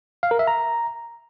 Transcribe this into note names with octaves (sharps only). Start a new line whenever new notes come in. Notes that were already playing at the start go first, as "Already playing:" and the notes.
F5
A#4
E5
A#5